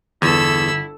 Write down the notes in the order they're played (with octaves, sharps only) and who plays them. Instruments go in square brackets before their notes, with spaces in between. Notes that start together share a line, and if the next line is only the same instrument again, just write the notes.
[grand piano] G1 [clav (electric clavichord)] E2 [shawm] E4 [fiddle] A4 E6